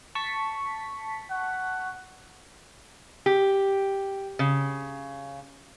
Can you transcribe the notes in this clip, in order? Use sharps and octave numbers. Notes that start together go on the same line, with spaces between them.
A5 C#6 B6
F#5
G4
C#3